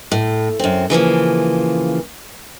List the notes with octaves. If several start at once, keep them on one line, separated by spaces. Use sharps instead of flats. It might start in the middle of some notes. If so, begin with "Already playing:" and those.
A2
F#2 C4
C#3 E3 F3 A#3